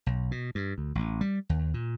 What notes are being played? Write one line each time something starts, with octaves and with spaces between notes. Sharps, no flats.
B1
B2
G2
D2
A1
G3
D#2
A#2